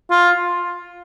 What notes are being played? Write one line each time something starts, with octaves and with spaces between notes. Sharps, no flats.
F4